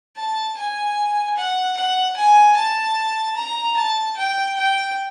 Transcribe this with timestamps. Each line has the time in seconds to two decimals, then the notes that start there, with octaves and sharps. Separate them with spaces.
0.16 A5
0.56 G#5
1.36 F#5
1.76 F#5
2.16 G#5
2.56 A5
3.36 A#5
3.76 A5
4.16 G5
4.56 G5